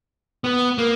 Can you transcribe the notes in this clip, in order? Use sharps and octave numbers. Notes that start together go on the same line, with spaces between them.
B3
A#3